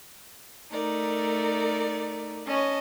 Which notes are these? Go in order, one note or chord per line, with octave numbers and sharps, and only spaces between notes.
A3 D#4 A#4 D5
C#4 D#5 A5